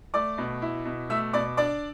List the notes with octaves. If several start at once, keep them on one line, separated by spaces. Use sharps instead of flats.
A3 D5 D6
B2
E4
B2
A3 E5 E6
B2 D5 D6
D4 D5 D6